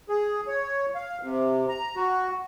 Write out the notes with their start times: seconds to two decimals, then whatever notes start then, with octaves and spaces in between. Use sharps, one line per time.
0.09 G#4
0.47 C#5
0.95 F5
1.22 C3
1.68 A#5
1.96 F#4